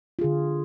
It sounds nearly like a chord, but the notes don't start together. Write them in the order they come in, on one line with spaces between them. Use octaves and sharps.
F4 G#4 D3